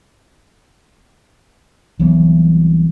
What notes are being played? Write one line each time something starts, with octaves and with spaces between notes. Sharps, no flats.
C2 E3 F#3 B3